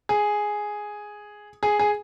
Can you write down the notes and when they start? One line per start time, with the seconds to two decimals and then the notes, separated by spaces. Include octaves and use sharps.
0.09 G#4
1.63 G#4
1.79 G#4